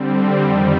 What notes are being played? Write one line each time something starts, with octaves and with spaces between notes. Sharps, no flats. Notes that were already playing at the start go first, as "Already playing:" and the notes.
Already playing: D3 G3 C4
F2 D#3 G3